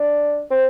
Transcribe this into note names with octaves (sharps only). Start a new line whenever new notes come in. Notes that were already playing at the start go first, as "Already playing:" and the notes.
Already playing: D4
C4